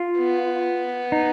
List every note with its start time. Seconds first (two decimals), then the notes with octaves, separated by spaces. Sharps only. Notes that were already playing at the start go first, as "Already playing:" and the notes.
Already playing: F4
0.18 B3
1.12 D#4